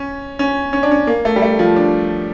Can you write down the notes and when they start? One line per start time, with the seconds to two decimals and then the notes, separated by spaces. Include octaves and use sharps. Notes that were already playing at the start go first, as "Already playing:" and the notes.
Already playing: C#4
0.39 C#4
0.73 C#4
0.83 D4
0.91 C#4
1.07 A#3
1.25 A3
1.36 G3
1.42 A3
1.59 F3
1.76 D4